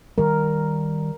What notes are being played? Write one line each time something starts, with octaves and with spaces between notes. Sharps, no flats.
D#3 G3 A#4